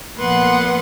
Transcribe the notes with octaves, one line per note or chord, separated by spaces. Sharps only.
A#2 F3 B3 B4 F#5 C6